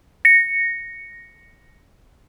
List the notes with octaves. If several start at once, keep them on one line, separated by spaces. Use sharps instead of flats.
A#6 C#7